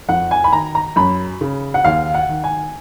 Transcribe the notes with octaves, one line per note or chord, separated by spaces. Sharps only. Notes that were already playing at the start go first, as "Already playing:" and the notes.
F2 F#5
G#5
B5
D#3 A#5
A#5
F#2 B5
C#3
F#5
D#2 F5
F#5
D#3
G#5